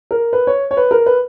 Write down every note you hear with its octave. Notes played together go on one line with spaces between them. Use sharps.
A#4
B4
C#5
C#5
B4
A#4
B4